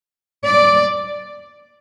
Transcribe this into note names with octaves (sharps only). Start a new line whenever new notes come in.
D5